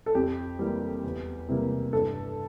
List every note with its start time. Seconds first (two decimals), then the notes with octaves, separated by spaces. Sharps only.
0.06 A4
0.15 F2 G4
0.59 E3 G3 A#3
1.04 E2
1.49 C3 E3 G3 A#3
1.93 G2 A4